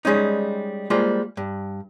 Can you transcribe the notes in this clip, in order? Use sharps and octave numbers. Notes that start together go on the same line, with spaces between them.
G3 G#3 C#4 D#4
G3 G#3 A#3 F4 C5
G2